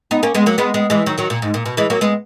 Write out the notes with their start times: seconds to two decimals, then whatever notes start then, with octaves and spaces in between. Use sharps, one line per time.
0.11 B3 D#4
0.23 A#3 C#4
0.35 G#3 B3
0.46 F#3 A#3
0.58 G#3 B3
0.74 G#3 B3
0.90 E3 G#3
1.06 D#3 F#3
1.18 D#3 F#3
1.30 A#2
1.42 G#2
1.54 A#2
1.66 B2
1.77 E3 G#3
1.90 F#3 A#3
2.01 G#3 B3